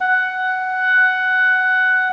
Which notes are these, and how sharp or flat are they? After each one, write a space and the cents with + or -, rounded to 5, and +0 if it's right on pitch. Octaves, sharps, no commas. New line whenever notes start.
F#5 +10